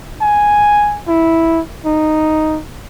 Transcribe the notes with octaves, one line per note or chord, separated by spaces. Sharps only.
G#5
E4
D#4